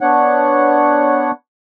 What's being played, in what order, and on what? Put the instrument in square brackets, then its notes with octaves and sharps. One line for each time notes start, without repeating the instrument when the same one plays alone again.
[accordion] B3 D4 C#5 F#5